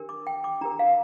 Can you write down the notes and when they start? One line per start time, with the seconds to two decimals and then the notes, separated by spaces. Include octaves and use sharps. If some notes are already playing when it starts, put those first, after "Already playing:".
Already playing: D4 G4 A#4
0.09 D6
0.27 G5
0.44 D6
0.61 D4 G4 A#4 A#5
0.79 F5